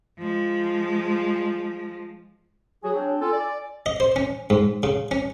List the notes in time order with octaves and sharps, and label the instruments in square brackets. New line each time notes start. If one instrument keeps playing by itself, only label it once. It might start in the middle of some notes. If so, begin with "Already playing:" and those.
[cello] F3 G#3
[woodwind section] F#3 F#4 G#4 [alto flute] G#5
[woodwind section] C4 D4 [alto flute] C#5
[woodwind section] F4 A4 [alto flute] G#5
[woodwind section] D5
[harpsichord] D#5
C5
C#4
G#2
C#3
C#4